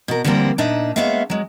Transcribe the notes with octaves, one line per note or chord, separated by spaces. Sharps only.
B2 A#4
D3 F3 G3 A#3 C4 A#4
A#2 D4 D#4 E5
G#3 A#3 B3 C#5 E5 F5
F#3 G#3